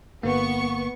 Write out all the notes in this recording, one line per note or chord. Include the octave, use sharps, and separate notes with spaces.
G1 A#3 B3 C#6